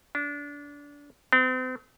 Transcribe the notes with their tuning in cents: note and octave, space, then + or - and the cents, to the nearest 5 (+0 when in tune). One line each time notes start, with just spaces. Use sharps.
D4 -25
C4 -40